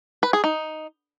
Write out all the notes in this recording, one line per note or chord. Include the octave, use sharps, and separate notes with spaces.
B4
G#4
D#4